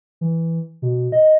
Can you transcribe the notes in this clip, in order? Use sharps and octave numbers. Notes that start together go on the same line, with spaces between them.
E3
B2
D#5